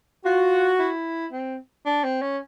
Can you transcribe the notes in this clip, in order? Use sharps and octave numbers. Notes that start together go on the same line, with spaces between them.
F4 F#4
E4
C4
D4
C4
C#4